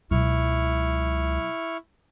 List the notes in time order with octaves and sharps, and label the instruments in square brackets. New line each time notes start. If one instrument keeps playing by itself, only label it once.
[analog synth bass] C#2 [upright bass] B2 F#3 [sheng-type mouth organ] E4 C#6 F6